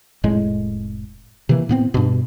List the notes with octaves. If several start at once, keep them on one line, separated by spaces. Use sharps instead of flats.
F1 A2 G#3
C3 D#3 E3 A#3
A2 B3 C4
G2 B2